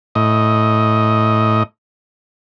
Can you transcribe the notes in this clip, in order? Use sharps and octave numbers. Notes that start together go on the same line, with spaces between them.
A2 D#5